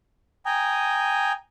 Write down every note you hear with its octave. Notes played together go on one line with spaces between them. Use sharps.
G5 G#5 A#5 D#6